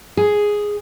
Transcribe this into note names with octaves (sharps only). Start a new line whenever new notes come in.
G#4